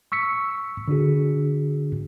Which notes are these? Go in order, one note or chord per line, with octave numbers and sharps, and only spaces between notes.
C#6 E6 B6 C#7
D3 D4 F#4 G#4